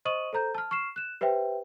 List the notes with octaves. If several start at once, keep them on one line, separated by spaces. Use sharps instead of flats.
C5 D#5 C#6 D#6 D#7 F#7
A4 C5 A#5 G6
A5 F6
C#6 F6 C7 E7
F#6 E7
G4 B4 C5 E5 G5